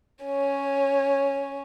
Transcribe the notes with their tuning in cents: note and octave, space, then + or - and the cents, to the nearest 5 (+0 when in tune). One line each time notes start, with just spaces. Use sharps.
C#4 +0 C#5 -5